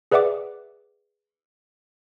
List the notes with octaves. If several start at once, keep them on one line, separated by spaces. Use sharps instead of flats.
G#4 B4 D5 E5 F#5 D6